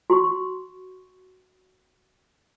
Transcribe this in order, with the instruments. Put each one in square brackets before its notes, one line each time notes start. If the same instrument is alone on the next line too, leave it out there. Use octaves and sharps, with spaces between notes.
[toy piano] F#4 C6 C#6